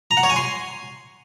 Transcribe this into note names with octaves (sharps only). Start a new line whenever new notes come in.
A#5
F#5
C#5
G#5
C6